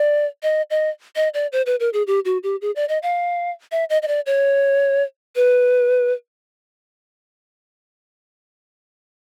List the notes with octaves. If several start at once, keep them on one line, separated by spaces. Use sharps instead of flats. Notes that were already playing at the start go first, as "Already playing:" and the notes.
Already playing: D5
D#5
D#5
D#5
D5
C5
B4
A#4
G#4
G4
F#4
G4
G#4
D5
D#5
F5
E5
D#5
D#5
D5
C#5
B4